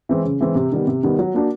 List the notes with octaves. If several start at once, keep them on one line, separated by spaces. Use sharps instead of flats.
E3 G#3 C4
C#3
E3 G#3 C4
C3
D#3 G3 B3
C3
D#3 G3 B3
F#3
A#3 D4 F#4